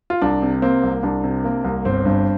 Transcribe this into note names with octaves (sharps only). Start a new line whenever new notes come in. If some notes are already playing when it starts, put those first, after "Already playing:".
F4
C2 D4
C3
A#3 C4
C2
C2 D4
C3
A#3
C2
G1 C4
G2